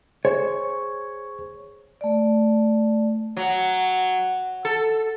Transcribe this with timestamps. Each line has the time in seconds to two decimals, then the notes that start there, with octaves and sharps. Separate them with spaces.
0.25 G#4 C5 C#5
2.01 A3 D5
3.37 F#3
4.65 A4